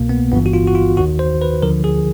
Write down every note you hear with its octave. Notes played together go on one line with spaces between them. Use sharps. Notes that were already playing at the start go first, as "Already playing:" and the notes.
Already playing: C2 B2 A#3
B3
G1 G2 E3 B3
F#4
F4
F#4
F4
D#2 D#3 F#4
C5
B4
D2 D3 F3 A#4
G#4